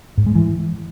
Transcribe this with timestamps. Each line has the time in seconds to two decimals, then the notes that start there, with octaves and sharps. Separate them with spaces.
0.18 G#2
0.26 G#3
0.35 E3